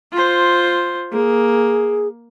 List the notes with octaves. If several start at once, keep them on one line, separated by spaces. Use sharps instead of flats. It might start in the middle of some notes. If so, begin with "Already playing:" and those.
F4 C5
A#3 G#4